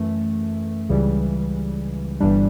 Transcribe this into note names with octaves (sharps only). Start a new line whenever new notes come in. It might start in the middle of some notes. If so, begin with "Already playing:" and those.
Already playing: F#2 E3 A3
C#2 C#3 E3 G3
G1 G2 E3 G3 D4